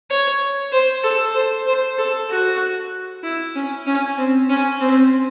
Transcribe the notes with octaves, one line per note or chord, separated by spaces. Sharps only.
C#5
C5
A4
C5
C5
A4
F#4
E4
C#4
C#4
C4
C#4
C4